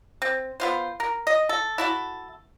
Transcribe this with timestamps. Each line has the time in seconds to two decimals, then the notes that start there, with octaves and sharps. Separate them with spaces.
0.22 C4
0.60 B3 F4 C5
1.00 A#4
1.27 D#5
1.49 A4
1.78 E4 F#4 A4